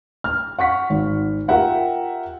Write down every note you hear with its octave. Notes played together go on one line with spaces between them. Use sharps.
F6
F#5 C#6 B6
G#1
F4 G4 A#4 E5 F#5 G5